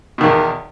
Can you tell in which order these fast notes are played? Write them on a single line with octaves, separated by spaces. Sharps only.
B2 D#3 E2